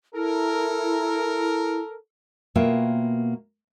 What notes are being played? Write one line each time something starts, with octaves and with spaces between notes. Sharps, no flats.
E4 A4 A#4
B2 A#3 F4 C#5 E5 G5